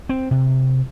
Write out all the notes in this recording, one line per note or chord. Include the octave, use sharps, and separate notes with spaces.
C4
C3